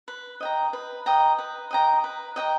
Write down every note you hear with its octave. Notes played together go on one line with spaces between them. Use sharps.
B4
D#5 G5 A#5
B4
D#5 G5 A#5
B4
D#5 G5 A#5
B4
D#5 G5 A#5